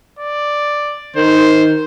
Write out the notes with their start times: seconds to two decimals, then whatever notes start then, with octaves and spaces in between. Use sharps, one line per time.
0.19 D5
1.16 D#3 C5